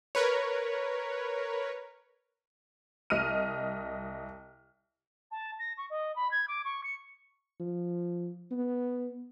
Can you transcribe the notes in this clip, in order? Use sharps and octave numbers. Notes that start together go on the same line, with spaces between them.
A#4 B4 C#5
C2 D#5 F6 D#7
A5
A#6
C#6
D#5
B5
G#6
D6
C#6
C#7
F3
B3